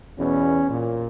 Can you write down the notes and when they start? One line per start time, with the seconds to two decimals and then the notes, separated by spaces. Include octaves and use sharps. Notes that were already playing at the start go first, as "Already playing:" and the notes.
0.18 E2 B2 C#4
0.69 A#2